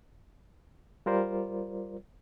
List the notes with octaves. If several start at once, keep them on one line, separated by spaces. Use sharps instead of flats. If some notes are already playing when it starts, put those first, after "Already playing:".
G3 F4 A#4 C5 D5